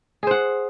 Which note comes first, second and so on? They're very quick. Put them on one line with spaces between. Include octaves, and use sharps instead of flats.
G#4 C5 F#5